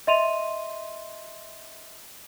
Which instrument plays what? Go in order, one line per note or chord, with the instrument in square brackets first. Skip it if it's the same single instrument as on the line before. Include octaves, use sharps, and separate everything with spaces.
[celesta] D#5 E5 C6 D#7 F7